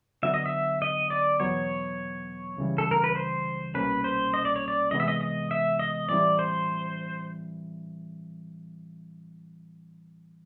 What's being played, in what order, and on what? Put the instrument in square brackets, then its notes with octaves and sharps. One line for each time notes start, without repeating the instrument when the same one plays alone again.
[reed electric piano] D3 F#3 B3 D4 F#4 [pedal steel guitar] E5
[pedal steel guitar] D#5
E5
D#5
D5
[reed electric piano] E2 B2 F#3 B3 [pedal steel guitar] C#5
[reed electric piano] C#2 C#3 E3 G3
[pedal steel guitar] A4
A#4
B4
C5
[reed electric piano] C2 B2 G3 A#3 C#4 [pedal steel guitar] B4
[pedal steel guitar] C5
D#5
D5
C#5
D5
[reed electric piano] C3 E3 G#3 B3 [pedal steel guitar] D#5
[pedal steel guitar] E5
D#5
D#5
E5
D#5
[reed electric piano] A2 E3 G3 C4 E4 [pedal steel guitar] D5
[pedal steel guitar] C5